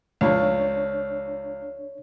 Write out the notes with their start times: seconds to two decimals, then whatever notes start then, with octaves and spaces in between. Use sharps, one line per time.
0.21 C#2 F3 D4 C#5